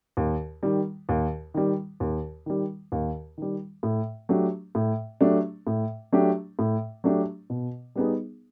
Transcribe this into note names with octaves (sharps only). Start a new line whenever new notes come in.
D#2
D#3 G3
D#2
D#3 G3
D#2
D#3 G3
D#2
D#3 G3
A2
F#3 A3 D4 G4
A2
F#3 A3 D4 G4
A2
F#3 A3 D4 G4
A2
F#3 A3 D4 G4
B2
G3 B3 D#4 G#4